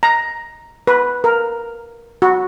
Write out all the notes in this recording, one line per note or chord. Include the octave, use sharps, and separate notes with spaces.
A#5
B4
A#4
F#4